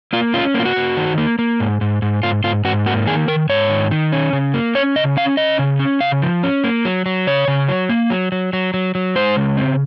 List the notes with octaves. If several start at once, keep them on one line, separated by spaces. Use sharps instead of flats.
A#3 F4
C#4 F4
A#3
F4
F#4
A#3
D#3
A#3
A#3
G#2
G#2
G#2
G#2 F4
G#2 F4
G#2 F#4
A#3 F#4
D#3 G#4
D#3 A#4
G#2 C#5
D#3
D#3
C#4
C#3
A#3
C#4 C#5
C#3 D#5
C#4 F5
C#4 D#5
C#3
C#4
C#3 F5
F3
C#4
A#3
F#3
F#3
C#3 C#5
C#3
F#3
A#3
F#3
F#3
F#3
F#3
F#3
G#3 C5
C#3
C4